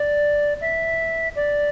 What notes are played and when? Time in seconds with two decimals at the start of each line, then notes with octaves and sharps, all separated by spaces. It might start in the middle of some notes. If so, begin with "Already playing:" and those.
Already playing: D5
0.61 E5
1.35 D5